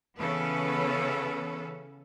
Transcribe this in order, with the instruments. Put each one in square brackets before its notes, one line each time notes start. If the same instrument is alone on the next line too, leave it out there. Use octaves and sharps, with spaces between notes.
[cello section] C#3 E3 B3 C#4 A4 B4